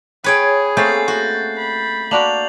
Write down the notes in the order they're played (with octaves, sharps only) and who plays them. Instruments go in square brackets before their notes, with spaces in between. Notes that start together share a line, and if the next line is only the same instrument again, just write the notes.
[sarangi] G#4 [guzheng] B4 C#5 G5
[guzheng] A3 [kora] A#3 C4 C#4 [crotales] G6 A6 C7
[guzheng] F#4
[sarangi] B5
[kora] A#3 D4 F#4 [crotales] F7 F#7